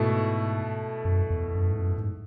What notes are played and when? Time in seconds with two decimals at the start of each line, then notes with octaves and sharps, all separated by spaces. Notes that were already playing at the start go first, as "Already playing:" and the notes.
Already playing: G#2 B2 A3 E4
1.05 F#2
1.30 E2
1.55 F#2
1.71 G#2
1.79 F#2
1.98 G#2